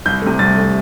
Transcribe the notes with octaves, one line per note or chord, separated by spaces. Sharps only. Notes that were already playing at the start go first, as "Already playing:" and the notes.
C2 G6
C3 A3
C2 A6
C3 A3